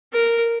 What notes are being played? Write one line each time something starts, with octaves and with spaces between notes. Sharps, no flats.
A#4